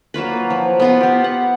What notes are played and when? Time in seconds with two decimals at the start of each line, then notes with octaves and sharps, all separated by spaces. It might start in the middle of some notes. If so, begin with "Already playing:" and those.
0.14 F#3 A#3 F4 B4
0.50 F3
0.80 B3 F4 C6
1.01 B3 G4
1.24 F#5